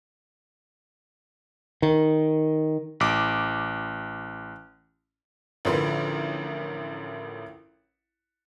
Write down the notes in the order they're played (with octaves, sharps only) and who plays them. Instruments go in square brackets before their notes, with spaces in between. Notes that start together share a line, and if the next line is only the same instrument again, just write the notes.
[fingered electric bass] D#3
[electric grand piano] A1 D6
[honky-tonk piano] A1 D3 F3 A#4 B4 C6